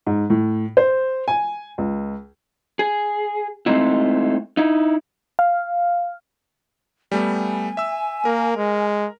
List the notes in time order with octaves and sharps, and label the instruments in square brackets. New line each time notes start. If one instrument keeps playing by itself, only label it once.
[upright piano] G#2
A2
C5
G#5
C#2
[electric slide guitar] G#4
G#3 A3 C4 D#4 E4
D#4 E4
[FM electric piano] F5
[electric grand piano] G3 A3 B3 [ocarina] G#5
[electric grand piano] E5 E6
[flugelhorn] A#3 [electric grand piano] A#4
[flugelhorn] G#3